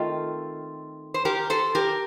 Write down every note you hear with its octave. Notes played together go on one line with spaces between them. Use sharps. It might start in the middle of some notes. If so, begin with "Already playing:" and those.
Already playing: D#3 A3 C4 F4 A4
C5
G4 A#4
A4 C5
G4 A#4